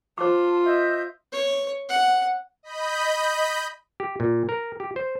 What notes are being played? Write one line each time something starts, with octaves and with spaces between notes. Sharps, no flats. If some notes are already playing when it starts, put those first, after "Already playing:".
F4 C5 A5 D6
D#5 E5 G6
C#5
F#5
D#5 B5 G6
G4
A#2
A#4
G4
C5